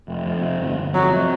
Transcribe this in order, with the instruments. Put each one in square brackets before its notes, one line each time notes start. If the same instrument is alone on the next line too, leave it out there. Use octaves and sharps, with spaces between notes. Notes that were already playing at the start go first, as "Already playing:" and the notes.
[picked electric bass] F1
F2
C3
G1
G1
[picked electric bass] F2 [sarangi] F#3
[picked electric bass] C3